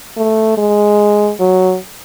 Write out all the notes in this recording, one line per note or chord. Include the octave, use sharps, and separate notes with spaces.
A3
G#3
F#3